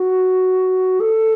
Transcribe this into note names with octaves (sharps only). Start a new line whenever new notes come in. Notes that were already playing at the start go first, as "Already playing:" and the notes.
Already playing: F#4
A4